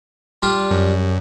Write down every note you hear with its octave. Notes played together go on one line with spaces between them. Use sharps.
G3 D4 F4
F#2